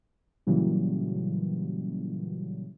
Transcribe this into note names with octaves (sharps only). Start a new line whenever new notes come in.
A#2 C#3 E3 F#3 G3